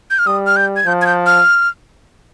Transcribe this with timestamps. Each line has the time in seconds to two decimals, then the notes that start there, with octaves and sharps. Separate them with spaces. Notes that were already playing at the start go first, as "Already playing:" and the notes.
0.11 G6
0.19 F6
0.27 G3 D#6
0.47 F6
0.56 G6
0.76 G#6
0.86 F3 G6
1.02 G#6
1.06 G6
1.26 F6